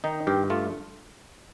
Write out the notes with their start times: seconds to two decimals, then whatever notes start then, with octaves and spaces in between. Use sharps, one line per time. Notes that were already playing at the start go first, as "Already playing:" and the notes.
0.04 D#3 D#4
0.27 G2 G4
0.50 A3 F4